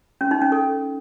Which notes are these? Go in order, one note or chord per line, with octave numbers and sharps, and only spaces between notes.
C#4
D#4
C#4
A4